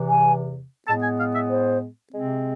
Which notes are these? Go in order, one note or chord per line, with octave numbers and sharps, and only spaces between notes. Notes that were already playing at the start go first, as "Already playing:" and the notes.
Already playing: E2 C3 E3
G#5
A2 G#3 B3 A5
G#5
F5
E5
C5
C3 G#3 C4